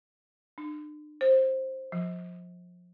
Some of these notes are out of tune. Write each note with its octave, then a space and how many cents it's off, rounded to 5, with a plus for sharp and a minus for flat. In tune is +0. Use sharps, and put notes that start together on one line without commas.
D4 +40
C5 +10
F3 +30